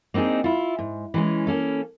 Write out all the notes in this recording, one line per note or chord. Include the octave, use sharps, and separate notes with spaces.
A#3 C4 D4 D#4 G#4
E4 F4
G#2
E3 G#3 C#4
A#3 C#4 A4